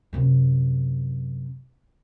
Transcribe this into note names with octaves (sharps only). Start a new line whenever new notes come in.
F#2 C3